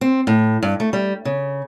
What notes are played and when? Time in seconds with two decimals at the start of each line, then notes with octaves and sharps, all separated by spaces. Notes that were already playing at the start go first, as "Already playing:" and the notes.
0.01 C4
0.27 A2
0.63 G2
0.80 A3
0.93 G3
1.25 C#3